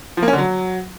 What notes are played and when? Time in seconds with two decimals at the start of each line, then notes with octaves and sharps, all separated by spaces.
0.17 F3
0.23 A#3
0.28 C#4
0.33 D3
0.38 F#3